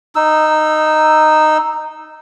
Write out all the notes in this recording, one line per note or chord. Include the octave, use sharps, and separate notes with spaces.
D#4 E6